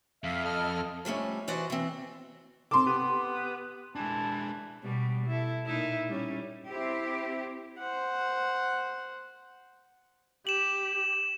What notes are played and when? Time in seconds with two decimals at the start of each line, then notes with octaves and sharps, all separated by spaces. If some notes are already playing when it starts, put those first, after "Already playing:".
0.24 F2 E5 F5
0.44 A4 D#5 F6
1.05 F3 G3 A3 C#4
1.48 E3 F#4 C5 D5 D#5
1.70 E3 C4
2.71 C3 C4 A4 C6 D6
2.86 B3 G4
3.95 E3 G#3 D4 A5
4.83 B2 G3
5.27 E4 A4
5.66 A#2 D#4 E4
6.09 G3 C#4
6.68 C4 E4 G4
7.79 C5 F#5
10.47 G4 E7 F#7